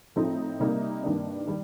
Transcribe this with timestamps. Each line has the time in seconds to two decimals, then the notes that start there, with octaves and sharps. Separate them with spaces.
0.16 A2 F3 A3 C4 D#4
0.60 C3 G3 A#3 D#4
1.04 G2 D#3 A#3 D4
1.47 D#3 G3